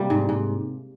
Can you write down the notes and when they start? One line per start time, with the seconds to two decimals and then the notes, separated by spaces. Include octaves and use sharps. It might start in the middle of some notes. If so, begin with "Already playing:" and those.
Already playing: C3 G3 A#3
0.10 G#2
0.29 G#2